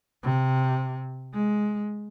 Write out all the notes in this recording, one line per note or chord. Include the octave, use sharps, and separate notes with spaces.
C3
G#3